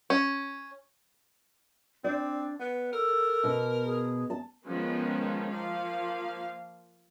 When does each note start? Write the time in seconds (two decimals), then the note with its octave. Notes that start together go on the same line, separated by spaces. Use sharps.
0.10 C#4
2.04 C4 D4 D5
2.60 B3 B4
2.93 A4 A#4
3.44 B2
3.86 G#4
4.30 A5
4.67 D#3 F3 G#3 B3 C#4
5.52 F3 A#3 F5